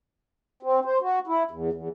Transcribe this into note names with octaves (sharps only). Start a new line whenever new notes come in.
C4
C5
F#4
E4
E2
E2